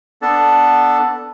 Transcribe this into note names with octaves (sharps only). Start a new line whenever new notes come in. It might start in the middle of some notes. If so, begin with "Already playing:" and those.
B3 D4 A4